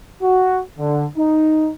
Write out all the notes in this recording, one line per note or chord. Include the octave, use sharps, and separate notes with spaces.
F#4
D3
D#4